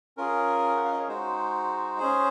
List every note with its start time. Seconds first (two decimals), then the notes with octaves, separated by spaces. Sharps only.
0.17 C#4 F4 G#4 A#4
0.77 F#5
0.84 F5
0.92 D#5
1.00 C#5
1.08 G#3 D#4 F#4 C5
2.00 C#4 G#4